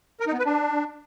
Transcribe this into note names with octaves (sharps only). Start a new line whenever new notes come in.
A#4
D#4
B3
B4
D4